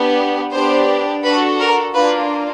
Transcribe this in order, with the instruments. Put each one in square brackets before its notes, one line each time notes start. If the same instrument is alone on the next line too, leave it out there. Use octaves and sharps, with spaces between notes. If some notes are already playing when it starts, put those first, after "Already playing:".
Already playing: [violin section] B3 D4 G4
B3 D4 G4 C5
D4 F#4 A4 B4
A#4
A#3 D4 F4 B4